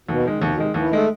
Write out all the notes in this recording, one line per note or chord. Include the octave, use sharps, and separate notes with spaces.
D#2 B2
D#3 G#3
C#3
D#2 C3
B2
C3 D#3 G#3
D#2 E3
D#3 G#3 A3